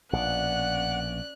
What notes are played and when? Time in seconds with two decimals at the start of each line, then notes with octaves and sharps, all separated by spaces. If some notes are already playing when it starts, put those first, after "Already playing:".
0.13 A#1 B2 C#4 D5 F#5 F#6